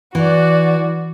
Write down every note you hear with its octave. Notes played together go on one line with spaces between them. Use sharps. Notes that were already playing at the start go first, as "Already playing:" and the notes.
E3 F#4 D5